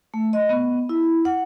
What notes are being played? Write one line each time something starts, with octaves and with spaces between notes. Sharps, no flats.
A3
D#5
B3
E4
F#5